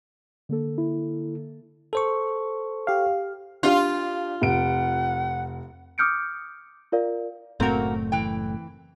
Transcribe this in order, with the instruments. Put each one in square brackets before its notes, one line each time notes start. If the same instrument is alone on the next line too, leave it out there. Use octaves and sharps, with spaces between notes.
[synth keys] D3 A#3 A4
[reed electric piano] E4
[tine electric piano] A4 C5 C#6
[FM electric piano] G4 F5
[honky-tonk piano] D4 G4 [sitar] F4
[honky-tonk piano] F1 D7 [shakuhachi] F#5
[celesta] D6 D#6 F6 G6 C#7 D7
F4 A#4 D5 F5
[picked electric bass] F#1 A2 A3 [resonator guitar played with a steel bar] A#3 F#4 [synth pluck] C4 A#4
[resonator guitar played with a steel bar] E3 G5